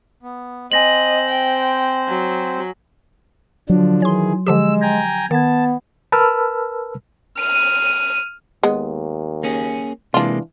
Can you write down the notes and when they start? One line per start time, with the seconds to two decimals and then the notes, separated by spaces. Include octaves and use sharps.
0.23 B3
0.72 C4 C5 D#5 G#5 A#6 F#7
1.29 G5
2.08 F#3
3.70 D3 F3 F#3 D4
4.02 D#3 E3 G#4 C#5 C6
4.47 D3 F3 G#3 G4 E6
4.82 G5 G#5 A#5
5.31 D#3 B3 A5 G#6
6.12 A#4 B4 A5 B5 E6 F6
7.39 F6 D#7
8.63 D#2 G#3 B3
9.43 A#3 C#4 G#4
10.14 C3 E3 G#3 A#3 D4 F4